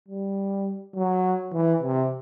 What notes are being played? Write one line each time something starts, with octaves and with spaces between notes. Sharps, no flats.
G3
F#3
E3
C3